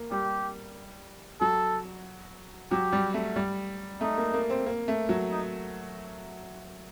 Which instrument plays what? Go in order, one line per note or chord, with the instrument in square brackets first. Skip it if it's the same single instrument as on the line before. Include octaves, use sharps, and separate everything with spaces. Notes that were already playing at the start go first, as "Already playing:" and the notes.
Already playing: [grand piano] A#3
[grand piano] G3 [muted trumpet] G4
[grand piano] F#3 [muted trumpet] A4
[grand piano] F#3 [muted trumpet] G4
[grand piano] G3
A3
G3
[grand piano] A3 [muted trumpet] D#4
[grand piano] A#3
A#3
C4
A#3
A3
F#3
[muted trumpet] D#4